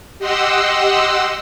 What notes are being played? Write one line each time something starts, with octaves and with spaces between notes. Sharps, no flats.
G4 D#5 F#5 C6 E6